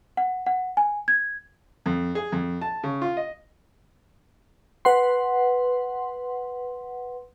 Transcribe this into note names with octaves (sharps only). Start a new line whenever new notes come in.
F#5
F#5
G#5
G#6
F2
G#4
F2
A5
C#3
F4
D#5
B4 F#5 C6